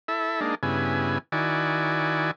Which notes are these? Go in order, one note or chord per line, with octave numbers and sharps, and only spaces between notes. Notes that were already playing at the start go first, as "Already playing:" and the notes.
E4 A4 E5
G#3 A#3 D4 D#4
G2 C#3 B3 E4 G#5
D#3 E4 F#4 D5 G#5